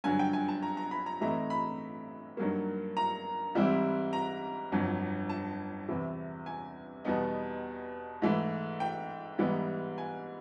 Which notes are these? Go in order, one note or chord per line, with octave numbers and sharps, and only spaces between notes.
G2 D3 F#3 G#5
G5
G#5
A5
A#5
A#5
B5
A#5
A2 E3 A3 C4 D#4 A#5
B5
G2 D#3 F#3 A#3
A#5
G#2 E3 G3 C4 E4
A#5
G1 F2 D3 F#3
A5
E2 C3 E3
G#5
E2 B2 G3 B3 D#4
G#2 E3 A3
G5
G#2 E3 G3 B3 D#4
G#5